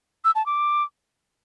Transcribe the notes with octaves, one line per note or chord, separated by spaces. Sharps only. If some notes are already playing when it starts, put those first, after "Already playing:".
E6
A5
D6